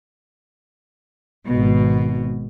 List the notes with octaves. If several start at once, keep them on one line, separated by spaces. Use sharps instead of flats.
G#1 B2